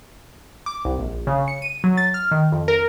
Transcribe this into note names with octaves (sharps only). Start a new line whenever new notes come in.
D6
C2
A#1
C#3
C#7
D#7
F#3
A6
F6
D#3
F2
A#4